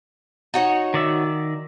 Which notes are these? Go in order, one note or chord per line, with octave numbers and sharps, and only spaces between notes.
D#4 F#4 C#5
D#3 D5 E5